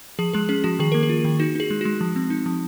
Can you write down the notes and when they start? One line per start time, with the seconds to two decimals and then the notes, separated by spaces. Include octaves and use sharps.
0.19 F3 G#4
0.33 G#3 G#4
0.49 C#4 G#4
0.64 F3 F#4
0.79 D#3 G#4
0.92 A#3 A#4
1.03 G#4
1.09 F4
1.25 D#3
1.39 D#4 F#4
1.55 D#4 G#4
1.71 G#3
1.81 G#3 F#4
2.01 F3
2.16 C4
2.30 D#4
2.46 F3